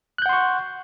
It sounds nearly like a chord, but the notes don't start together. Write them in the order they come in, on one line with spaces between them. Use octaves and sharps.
F#6 G6 F#5 C6 C#6